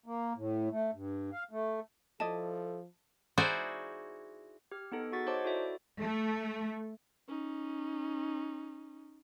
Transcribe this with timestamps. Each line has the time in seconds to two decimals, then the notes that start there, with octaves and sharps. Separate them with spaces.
0.06 A#3
0.36 A2
0.71 A3
0.94 G2
1.32 F5
1.51 A3
2.20 F3 E4 A4 D5 D#5 A5
3.38 D#4 E4 F#4 G#4 C5 D5
4.72 G4 F6
4.92 B3 D#4 A4
5.12 F#4 G#4 F#5 C#6 A6 B6
5.26 D#4 C5 C#5 D#5 A5 D6
5.44 E4 F#4 A4 D5 E5
6.01 A3
7.28 C#4 D#4